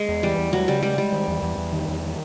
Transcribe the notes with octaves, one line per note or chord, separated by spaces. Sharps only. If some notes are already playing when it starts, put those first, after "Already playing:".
Already playing: G#3
E2
E3 G3
E2
F#3 G#3
C#3 G3
G3 G#3
G3 G#3
D#3
E2
E2
E2
D#3
E2
D#3